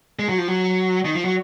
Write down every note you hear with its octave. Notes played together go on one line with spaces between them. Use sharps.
G#3
F#3
F3
F#3
D#3
F3
F#3